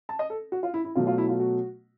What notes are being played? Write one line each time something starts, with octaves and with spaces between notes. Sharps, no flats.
A5
D#5
A4
F#4
F4
E4
E4
B2 F#3 A3 F4
F4
E4
F4
F#4